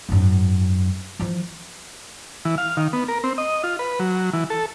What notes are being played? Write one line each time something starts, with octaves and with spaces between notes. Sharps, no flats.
G#1 F#2
E3 F3
E3
F5
D#3
B3
A#4
C4
D#5
F4
B4
F#3
E3
A4